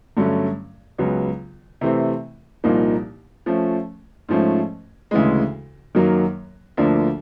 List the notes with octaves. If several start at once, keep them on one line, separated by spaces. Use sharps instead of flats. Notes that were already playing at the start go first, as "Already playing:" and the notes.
G2 D3 F#3 A3 C#4
C#2 C#3 F#3 B3
C3 E3 A3 C4
C2 A#2 F3 A#3 D#4
F3 A3 C#4
G#2 F3 A3 C#4
D2 C#3 E3 G#3
F#2 D#3 F#3 A#3
D2 D3 F3 A#3 D4